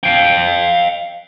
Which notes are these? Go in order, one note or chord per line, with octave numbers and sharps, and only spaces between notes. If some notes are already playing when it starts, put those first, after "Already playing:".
F5 G5